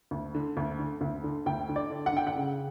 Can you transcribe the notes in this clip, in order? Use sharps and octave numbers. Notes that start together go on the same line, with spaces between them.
D2
D3
D2
D3
D2
D3
D2 G5
D3
D5
D3
F#5
D3 G5
F#5
C#3